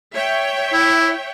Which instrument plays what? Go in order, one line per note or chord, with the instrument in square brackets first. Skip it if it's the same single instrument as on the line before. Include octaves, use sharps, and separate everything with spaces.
[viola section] C#5 E5 G5
[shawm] E4